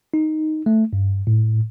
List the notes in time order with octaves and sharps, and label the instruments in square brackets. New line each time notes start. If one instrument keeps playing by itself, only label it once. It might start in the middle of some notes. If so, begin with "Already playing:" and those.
[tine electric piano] D#4
A3
G2
A2